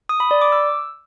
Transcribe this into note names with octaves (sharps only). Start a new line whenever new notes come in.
D#6
B5
D5
D6
E6